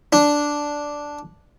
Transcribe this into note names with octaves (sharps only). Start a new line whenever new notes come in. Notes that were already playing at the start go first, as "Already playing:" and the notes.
D4